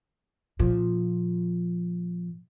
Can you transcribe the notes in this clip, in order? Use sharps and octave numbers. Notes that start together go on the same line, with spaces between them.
A#2 F3